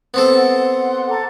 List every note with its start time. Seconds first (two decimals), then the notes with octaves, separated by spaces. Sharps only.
0.14 B3 C4 A4
0.37 F#5 C6
1.08 A4 A#5 D6